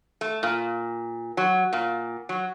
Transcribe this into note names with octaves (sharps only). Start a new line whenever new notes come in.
A3
A#2
F#3
A#2
F#3